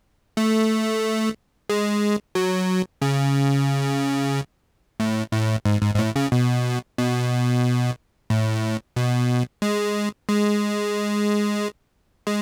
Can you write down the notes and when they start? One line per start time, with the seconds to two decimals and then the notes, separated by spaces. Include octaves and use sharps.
0.37 A3
1.70 G#3
2.35 F#3
3.02 C#3
5.00 A2
5.33 A2
5.66 G#2
5.82 G#2
5.95 G#2
5.99 A2
6.16 C#3
6.32 B2
6.98 B2
8.30 A2
8.96 B2
9.62 G#3
10.29 G#3
12.27 G#3